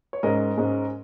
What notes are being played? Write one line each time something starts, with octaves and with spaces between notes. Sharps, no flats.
C#5
G#2 G#3 C#4 A#4 D#5
G#2 G#3 C#4